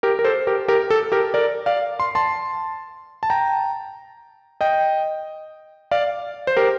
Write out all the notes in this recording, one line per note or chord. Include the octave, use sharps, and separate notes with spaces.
G4 A#4
A#4
A4 C5
G4 A#4
G4 A#4
A4
G4 A#4
A#4 D5
D5 F5
C6
A5 C6
A5
G5 A#5
D#5 G5
D5 F5
C5
G4 A#4